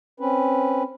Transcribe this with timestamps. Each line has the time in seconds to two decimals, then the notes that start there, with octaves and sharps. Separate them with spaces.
0.20 C4 C#4 B4